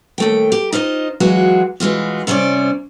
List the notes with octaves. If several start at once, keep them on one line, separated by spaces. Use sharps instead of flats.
D#2 A3 G5
G4
D#4 F4 C5 D#5
E3 F#3 G#3 F4 F#4
E3 G#3 F4 F#4
C3 G3 C#4 C5 D5